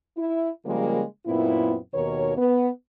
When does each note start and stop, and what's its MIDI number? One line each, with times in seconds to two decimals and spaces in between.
0.17 0.49 64
0.66 1.03 49
0.66 1.03 53
0.66 1.03 55
0.66 1.03 56
0.66 1.03 58
1.27 1.76 42
1.27 1.76 46
1.27 1.76 59
1.27 1.76 60
1.27 1.76 64
1.94 2.34 39
1.94 2.34 47
1.94 2.34 51
1.94 2.34 70
1.94 2.34 73
2.38 2.69 59